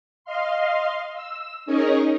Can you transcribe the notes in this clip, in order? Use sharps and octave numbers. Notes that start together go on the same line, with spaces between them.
D#5 F5 C6
E6
C#4 D#4 G#4 A#4 C#5 D#5